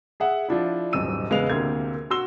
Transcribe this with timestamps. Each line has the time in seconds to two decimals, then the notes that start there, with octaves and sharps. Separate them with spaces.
0.20 G#4 E5 F#5
0.48 F3 D4 E4
0.93 D#1 B1 G#2 E6 D#7
1.30 E1 C#3 G#3 B3 F5 F7
1.50 D2 C3 A#3 G#6
2.10 F#4 C6 E6 G7